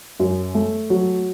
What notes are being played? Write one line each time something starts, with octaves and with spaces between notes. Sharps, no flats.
F#2
A3
F#3